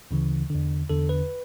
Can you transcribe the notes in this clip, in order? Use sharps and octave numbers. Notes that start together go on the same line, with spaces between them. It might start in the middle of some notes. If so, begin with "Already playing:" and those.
D2 C#3 E3
E2 D3
E2 D3 A4
B4